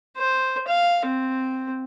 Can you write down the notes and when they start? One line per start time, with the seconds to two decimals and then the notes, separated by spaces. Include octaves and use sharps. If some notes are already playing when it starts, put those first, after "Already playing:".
0.17 C5
0.67 F5
1.06 C4